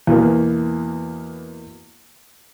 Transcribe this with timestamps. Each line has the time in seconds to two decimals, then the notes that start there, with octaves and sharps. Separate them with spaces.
0.07 E2 B2 A#3